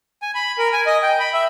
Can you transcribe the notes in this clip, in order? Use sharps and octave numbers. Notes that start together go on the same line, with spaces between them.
G#5
B5
A#4
G#5
D#5
G5
B5
E5